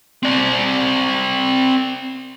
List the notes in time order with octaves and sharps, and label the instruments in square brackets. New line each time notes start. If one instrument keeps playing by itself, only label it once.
[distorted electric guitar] C4 D5